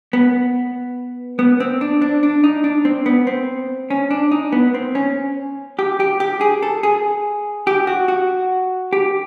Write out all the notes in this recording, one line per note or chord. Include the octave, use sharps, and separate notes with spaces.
B3
B3
C4
D4
D4
D4
D#4
D4
C4
B3
C4
C#4
D4
D#4
B3
C4
C#4
G4
G4
G4
G#4
A4
G#4
G4
F#4
F#4
G4